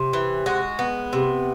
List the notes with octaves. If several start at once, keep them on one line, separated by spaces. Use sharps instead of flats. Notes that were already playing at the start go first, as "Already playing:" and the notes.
Already playing: C3
E3
G#3 F#4
B3
C3